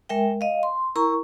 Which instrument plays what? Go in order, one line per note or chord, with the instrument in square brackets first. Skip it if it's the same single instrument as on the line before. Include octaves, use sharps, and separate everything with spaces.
[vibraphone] G#3 A#4 E5 G5
D#5 F5
C6
E4 A#4 A#5 C#6